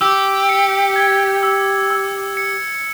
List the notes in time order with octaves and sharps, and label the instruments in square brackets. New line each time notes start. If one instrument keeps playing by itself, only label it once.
[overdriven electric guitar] G4 [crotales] E6
[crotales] C#7
G#6
E6
E6
C#7